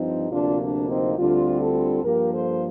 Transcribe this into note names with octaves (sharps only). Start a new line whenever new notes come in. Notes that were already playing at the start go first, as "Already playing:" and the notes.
Already playing: G2 F3 C4 D#4
D2 C3 F3 A#3 D4 F4
D4
C4 D#4
D2 D3 G3 C4 D4 F4
F4 A4
G2 F3 A#3 G4 A#4
A4 C5